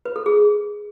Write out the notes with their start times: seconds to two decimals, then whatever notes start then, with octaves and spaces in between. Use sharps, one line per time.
0.05 B4
0.16 A4
0.26 G#4